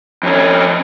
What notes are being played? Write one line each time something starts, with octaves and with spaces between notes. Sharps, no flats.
F2 C#4